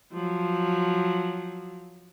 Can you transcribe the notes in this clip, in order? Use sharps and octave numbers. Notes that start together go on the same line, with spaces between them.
F3 F#3